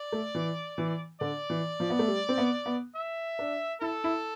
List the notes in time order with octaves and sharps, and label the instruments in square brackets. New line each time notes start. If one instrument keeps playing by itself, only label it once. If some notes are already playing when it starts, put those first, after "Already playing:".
Already playing: [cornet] D5
[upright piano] A3
E3
E3
[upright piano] D3 [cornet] D5
[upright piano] E3
F3
B3
A3
G3
C4
B3
B3
[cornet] E5
[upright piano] D4
[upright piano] E4 [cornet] A4
[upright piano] E4